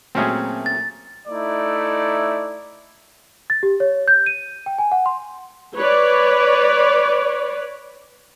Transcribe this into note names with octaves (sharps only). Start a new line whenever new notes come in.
A#2 F#3 A3 C4 C#4 G#4
A6
A3 D#4 E4 D5
A6
G4
C#5
G6
D#7
G5
G#5
F#5
C6
B4 C#5 D5